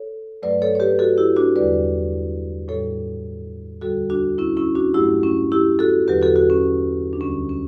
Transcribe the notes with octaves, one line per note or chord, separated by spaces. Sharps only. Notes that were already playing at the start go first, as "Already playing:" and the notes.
Already playing: A4 C#5
G2 F#3 A3 B4 D5
A4 C#5
C#5
G4 B4
F#4 A4
E4 G4
D4 F#4
E2 D3 G3 B4 D5
A2 G3 A4 C#5
D2 D3 G3 F#4 A4
D4 F#4
C#4 E4
C#4 E4
D4 F#4
G2 F#3 A3 E4 G4
C#4 E4
E4 G4
F#4 A4
E2 D3 F#3 G4 B4
F#4 A4
F#4 A4
C#4
D4
D2 D3 G3 C#4
C#4